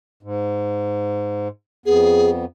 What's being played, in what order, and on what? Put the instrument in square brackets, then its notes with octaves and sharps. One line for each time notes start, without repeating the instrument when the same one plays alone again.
[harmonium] G#2
[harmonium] F2 B3 [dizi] G#4